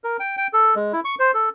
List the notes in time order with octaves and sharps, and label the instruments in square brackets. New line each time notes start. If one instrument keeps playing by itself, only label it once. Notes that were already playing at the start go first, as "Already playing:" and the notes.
[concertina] A#4
G5
G5
A4
G#3
E4
C#6
C5
A4